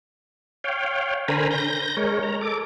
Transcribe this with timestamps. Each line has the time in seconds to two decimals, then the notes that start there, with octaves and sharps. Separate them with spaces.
0.64 C#5 F5 G5
1.28 D3 A#4 C5 G#5 A#5 B5
1.51 G6 A#6
1.97 G#3 A#4 C#5
2.23 A#5
2.41 A4 D6